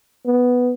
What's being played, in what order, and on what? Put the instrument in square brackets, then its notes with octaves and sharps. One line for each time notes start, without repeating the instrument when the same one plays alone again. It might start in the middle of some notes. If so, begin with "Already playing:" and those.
[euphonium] B3